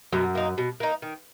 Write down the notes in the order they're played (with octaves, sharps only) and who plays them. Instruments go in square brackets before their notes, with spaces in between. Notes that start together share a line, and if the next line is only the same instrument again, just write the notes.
[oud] F#2 [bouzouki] B2
[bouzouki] A#3 D#4
B2
A#3 D#4
D#3